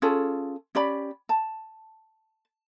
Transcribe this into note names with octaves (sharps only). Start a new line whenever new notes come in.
C#4 F4 G#4 A4
C#4 G4 D5 B5
A5